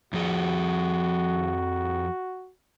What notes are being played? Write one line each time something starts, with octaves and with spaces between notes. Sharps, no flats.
F2 F3 F#4 G#4